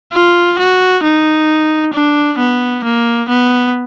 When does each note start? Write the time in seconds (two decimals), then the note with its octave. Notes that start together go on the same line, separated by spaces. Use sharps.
0.13 F4
0.59 F#4
1.03 D#4
1.93 D4
2.38 B3
2.84 A#3
3.29 B3